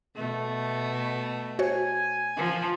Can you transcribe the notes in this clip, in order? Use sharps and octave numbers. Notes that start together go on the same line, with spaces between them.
B2 A3
F#4 C5 C#5 G#5
F3